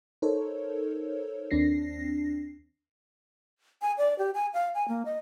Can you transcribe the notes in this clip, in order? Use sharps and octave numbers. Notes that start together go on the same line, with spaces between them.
D#4 A4 A#4 C5 C#5
D#2 C4 D4 A#6 C7
G#5
D5
G4
G#5
F5
G#5
A#3
D#5